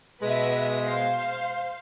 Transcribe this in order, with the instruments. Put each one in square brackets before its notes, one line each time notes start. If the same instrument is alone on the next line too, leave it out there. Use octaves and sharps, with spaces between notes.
[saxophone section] B2 G#3 [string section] B4 E5
[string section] C5 F5